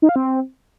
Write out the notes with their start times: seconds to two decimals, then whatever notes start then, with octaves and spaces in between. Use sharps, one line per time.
0.02 D#4
0.09 F5
0.16 C4